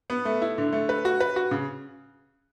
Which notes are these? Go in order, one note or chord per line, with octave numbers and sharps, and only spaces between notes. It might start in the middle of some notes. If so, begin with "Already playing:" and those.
B3
A3
E4
D3
A3
B4
F#4
B4
F#4
C#3